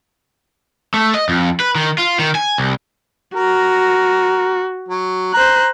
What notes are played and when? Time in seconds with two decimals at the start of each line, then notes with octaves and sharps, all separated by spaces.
0.94 A3
1.14 D#5
1.29 F2
1.60 B4
1.75 D#3
1.98 F4
2.19 D#3
2.35 G#5
2.58 C2
3.36 F#4 A#4
4.88 F#3
5.34 C5 A#5 F#6